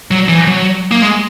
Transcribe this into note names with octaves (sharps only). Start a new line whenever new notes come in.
F#3
E3
F#3
A#3
G#3